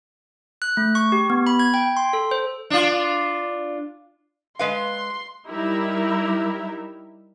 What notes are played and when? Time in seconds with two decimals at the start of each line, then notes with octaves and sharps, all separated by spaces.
0.62 F#6
0.77 A3
0.95 C#6
1.12 G4
1.30 B3
1.47 B5
1.59 G#6
1.74 G5
1.97 C6
2.13 A4
2.31 C5
2.70 D4 F4
4.59 G#3 B4 F5 C6
5.49 G3 D#4 E4 G4 A#4 E5